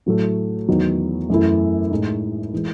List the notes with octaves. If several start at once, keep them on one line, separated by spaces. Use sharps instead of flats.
A2 F#3 A3
E2 D#3 F#3
F#2 E3 A3 E4
A2 G#3 D#4
E3 G#3